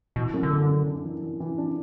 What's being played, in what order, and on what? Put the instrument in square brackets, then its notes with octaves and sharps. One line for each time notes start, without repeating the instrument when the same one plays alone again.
[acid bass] B2 [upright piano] E3
[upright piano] F#2
[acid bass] D3
[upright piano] F#2
F#2
D4
E3
E3
E3
D4